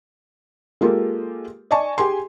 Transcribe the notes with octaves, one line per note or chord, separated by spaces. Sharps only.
G#3 A#3 F4 G4 A4
D5 D#5 G#5 A5 C#6
G4 G#4 G#5 C6